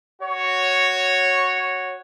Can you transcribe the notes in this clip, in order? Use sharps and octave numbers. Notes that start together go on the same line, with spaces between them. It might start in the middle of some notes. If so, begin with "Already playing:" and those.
F#4 C#5